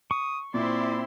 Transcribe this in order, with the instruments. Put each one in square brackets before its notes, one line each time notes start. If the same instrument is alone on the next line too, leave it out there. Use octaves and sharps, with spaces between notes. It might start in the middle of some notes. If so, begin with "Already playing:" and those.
[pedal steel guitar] C#6 [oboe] D#6
[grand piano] A#2 [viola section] C4 E4 C6 [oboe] D5